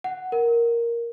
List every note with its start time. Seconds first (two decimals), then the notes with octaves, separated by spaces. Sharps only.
0.04 F#5
0.32 A#4